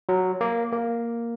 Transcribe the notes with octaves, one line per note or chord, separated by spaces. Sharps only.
F#3
A#3
A#3